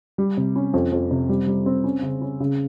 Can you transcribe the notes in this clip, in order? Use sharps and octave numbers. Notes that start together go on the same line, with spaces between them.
G3
C3
C#4
F2
F2
C3
G3
G3
C4
C#4
C#3
C#4
C#3